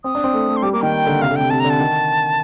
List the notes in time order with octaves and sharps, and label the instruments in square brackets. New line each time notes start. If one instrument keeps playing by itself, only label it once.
[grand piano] C4 [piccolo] D#6
[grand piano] D4
C4
A3
A3
[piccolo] C6
[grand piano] G3 [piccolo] D6
[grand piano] A#3 [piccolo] D6
[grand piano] D#3 [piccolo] G5
[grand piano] D3
[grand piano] C3 [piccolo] F5
[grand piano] D3
[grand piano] C3 [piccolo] G5
[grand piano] C3 [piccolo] A5
[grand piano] D3 [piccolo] A#5
[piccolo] A5
[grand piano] D#3